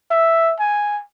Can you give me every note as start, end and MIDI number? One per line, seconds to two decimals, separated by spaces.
0.11 0.53 76
0.59 1.01 80